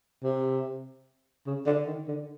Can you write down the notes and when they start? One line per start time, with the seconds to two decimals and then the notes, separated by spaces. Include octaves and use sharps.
0.23 C3
1.47 C#3
1.66 D3
1.87 D#3
2.08 D3